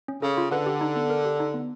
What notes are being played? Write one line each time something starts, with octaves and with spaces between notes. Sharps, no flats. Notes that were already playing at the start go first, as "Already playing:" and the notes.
C#4
C#3 A4
F4
D3 B4
G4
D#4
B3
A#4
G4
D#4
B3